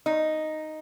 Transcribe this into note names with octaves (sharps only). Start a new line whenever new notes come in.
D#4